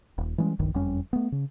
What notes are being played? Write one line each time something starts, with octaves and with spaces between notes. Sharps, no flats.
D#1
E3 G3 G#3 C#4
D1 A#1 G2 D#3
F#1 F2 G3 C#4
A3 B3
C#3